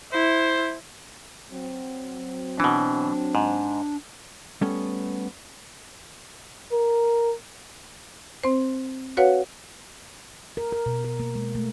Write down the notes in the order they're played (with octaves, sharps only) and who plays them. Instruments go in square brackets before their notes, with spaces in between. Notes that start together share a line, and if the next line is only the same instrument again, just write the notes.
[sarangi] E4 [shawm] C5
[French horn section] F#3 C4
[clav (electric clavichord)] B2 E3 [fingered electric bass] D4
[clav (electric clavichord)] G#2
[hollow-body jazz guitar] G3 A3 B3 C#4 A4
[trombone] A#4
[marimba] C4 C5
F#4 B4 C#5 F5 F#5
[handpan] A#4
A#4
B2
A#4
A#3
G#3
A3